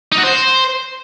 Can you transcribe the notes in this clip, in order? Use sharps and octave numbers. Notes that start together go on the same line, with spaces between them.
D#4
F#4
C5